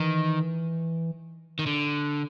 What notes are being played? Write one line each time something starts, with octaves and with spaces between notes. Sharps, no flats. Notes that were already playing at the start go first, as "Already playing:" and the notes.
Already playing: D#3 E3
D#3
D3